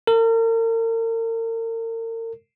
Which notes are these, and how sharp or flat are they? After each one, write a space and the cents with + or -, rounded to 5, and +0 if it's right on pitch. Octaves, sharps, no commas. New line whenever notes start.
A#4 -40